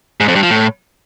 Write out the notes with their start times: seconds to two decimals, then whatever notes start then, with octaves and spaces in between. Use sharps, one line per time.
0.20 G#2
0.28 F2
0.35 G2
0.43 F3
0.51 A2